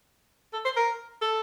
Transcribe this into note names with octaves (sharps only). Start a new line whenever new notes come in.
A4
C5
A#4
A4